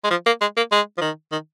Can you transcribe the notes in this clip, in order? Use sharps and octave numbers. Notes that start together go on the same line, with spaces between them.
G#3
F3
A#3
G#3
A#3
G#3
F3
D#3
D#3